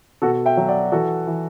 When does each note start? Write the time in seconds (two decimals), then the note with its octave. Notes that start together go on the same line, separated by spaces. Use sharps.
0.22 B2 F#4 A4
0.46 E5 G5
0.57 F#3
0.68 D5 F#5
0.92 E3 F#4 A4
1.27 E3